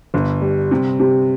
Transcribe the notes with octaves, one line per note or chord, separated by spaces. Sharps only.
G1
G3
C3
C3